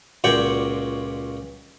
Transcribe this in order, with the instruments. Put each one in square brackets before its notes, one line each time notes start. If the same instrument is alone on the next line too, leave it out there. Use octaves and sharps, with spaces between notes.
[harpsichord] C#2 A#2 F#4 C#5 D5 G5